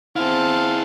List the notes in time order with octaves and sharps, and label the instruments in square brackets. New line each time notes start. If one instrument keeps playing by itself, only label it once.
[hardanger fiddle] C4 A5 [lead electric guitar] E4 G#4 [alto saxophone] F5